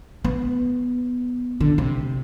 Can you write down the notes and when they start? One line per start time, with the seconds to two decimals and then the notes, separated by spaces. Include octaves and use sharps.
0.25 B3
1.61 D3
1.78 C3